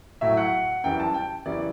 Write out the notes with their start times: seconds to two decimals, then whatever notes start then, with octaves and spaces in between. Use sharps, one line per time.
0.21 A2 F#3 E5
0.37 F#5
0.84 F#2 E3 G3 G5
1.00 A5
1.14 G5
1.45 F#2 C#3 E3 G3 D5